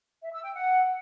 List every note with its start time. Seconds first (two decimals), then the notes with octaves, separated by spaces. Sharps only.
0.21 E5
0.32 E6
0.44 G5
0.55 F#5